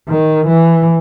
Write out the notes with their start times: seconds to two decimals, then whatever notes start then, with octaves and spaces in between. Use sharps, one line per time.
0.08 D#3
0.47 E3